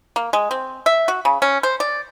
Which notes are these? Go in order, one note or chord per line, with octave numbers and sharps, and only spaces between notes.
A#3
G#3
C4
E5
F#4
C#3
C#4
C5
D5